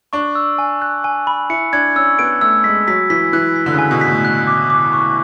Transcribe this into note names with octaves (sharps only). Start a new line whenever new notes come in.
D4 C#6
E6
G#5
F#6
G#5
B5
E4 C#7
D4 G#6
C#4 E6
B3 D7
A3 E6
G#3 B6
F#3 B6
E3 B6
E3 F#6
B6
D3
C#3
G#5
B2
B6
A2
F#6
D6
D6
C#6